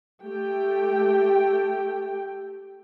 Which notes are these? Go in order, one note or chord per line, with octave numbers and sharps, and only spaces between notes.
A3 G4 G5